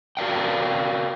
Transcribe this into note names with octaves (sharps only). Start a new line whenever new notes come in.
F#4 A#4 D5 F5 G5